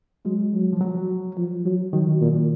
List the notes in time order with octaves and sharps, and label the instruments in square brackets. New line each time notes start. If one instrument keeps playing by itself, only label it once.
[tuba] F#3 [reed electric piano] G#3
[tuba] F#3
[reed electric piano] F3
F#3
[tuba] F3
F#3
[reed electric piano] D#3 [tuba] F#3
[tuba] A#2